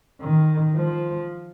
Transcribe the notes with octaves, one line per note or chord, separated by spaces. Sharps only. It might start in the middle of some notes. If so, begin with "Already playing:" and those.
D#3
F3